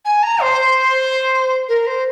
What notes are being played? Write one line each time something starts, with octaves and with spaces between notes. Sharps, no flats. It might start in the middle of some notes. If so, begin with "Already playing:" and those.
G#5
A#5
C5
A#4
C5